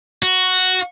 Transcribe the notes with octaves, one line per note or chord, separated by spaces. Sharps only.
F#4